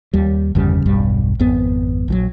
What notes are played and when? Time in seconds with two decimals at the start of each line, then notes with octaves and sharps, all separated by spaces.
0.14 D#2 G3
0.55 G1 E2 C#3 G3
0.86 E1 B1 G2 G3
1.40 G#1 F2 B3
2.08 A#1 E3 F#3